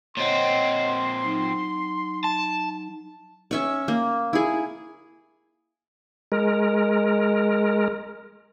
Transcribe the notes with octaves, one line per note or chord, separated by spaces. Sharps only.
A#2 C4 C#5 D#5 F#5 C6
F#3 D#4
A5
C#4 E5 C#6
A#3
E4 G#4
G#3 A#4